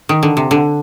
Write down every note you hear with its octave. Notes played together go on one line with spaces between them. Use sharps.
D#3
D3
C3
D3